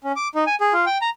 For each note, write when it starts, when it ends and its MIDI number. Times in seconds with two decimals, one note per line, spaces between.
0.04 0.12 61
0.16 0.28 86
0.35 0.44 63
0.47 0.55 80
0.61 0.73 68
0.73 0.85 65
0.86 0.98 79
1.01 1.10 82